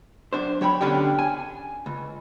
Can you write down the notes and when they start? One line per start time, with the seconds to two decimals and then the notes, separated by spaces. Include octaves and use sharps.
0.33 F#2 D4 C5
0.61 F#3 C#5 G5 B5
0.81 B2 D3 C#4 D4 G4
1.19 G#5
1.86 C#2